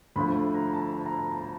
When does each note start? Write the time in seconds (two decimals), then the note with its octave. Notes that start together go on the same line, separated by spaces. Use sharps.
0.16 D2 D3 F3 A3 B5
0.54 A#5
0.74 A5
0.93 A5
1.06 A#5
1.18 A5
1.31 A5
1.41 A#5